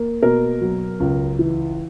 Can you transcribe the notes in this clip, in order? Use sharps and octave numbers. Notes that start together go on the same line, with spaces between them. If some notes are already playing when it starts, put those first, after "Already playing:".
Already playing: A#3
B2 A#4
F#3
C#2
E3